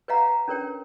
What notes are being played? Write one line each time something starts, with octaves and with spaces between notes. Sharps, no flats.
B4 C#5 D#5 F5 F#5 A#5
C#4 D4 A#4 B4 C#5 G5